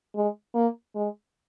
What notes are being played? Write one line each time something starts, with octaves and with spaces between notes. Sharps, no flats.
G#3
A#3
G#3